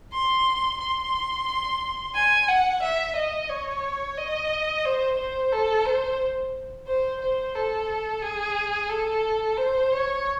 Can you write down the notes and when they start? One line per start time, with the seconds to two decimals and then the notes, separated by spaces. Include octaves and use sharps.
0.13 C6
0.80 C6
2.15 G#5
2.48 F#5
2.83 E5
3.16 D#5
3.50 C#5
4.18 D#5
4.85 C5
5.18 C5
5.52 A4
5.86 C5
6.87 C5
7.21 C5
7.55 A4
8.22 G#4
8.89 A4
9.57 C5
9.92 C#5